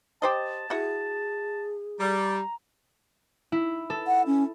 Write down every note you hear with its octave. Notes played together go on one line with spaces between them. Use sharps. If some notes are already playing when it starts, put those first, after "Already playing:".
G4 C5 D#5 A5
E4 F#4 G#4
G3 A#5
E4
A4
F#5
C#4